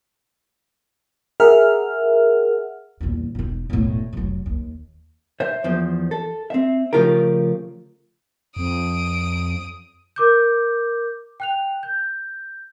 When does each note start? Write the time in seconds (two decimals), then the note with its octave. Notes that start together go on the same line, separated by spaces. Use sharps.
1.40 G#4 A#4 E5 F#5 F6
3.01 D#1 E2
3.35 E1 D#4
3.70 E1 A2
4.13 F1 F#3
4.46 D#2
5.40 C5 E5
5.64 E2 F3 C5
6.11 A4
6.50 C4 E5
6.93 C#3 F3 A3 F4 G4 A#4
8.56 F2 D#6 D7
10.16 A#4 D6 G6
11.40 G5 F#6 F7
11.83 G6